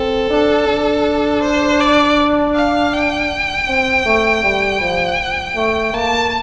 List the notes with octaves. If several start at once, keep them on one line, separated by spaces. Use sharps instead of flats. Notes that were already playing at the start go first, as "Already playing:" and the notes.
Already playing: C4 A4
D4
D4
C5
D5
F5
G5
C4
A3
G3
F3
A3
A#3 A5